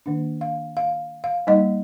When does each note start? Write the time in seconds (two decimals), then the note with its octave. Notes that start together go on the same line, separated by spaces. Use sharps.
0.06 D#3 A#3 D4
0.41 F5
0.77 F5
1.24 F5
1.47 G3 A#3 D#4 D#5